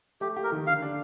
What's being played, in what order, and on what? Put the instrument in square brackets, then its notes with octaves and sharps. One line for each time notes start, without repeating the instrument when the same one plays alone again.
[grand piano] A3 [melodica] G4
[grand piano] G4
[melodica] A#4
[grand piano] D#3
[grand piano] D3 [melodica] F5
[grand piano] D4